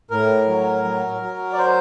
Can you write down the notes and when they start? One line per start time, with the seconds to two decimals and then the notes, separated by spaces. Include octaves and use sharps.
0.11 A2 A#4
0.48 F#3
0.85 F#3
1.22 F#3
1.53 D5
1.58 C5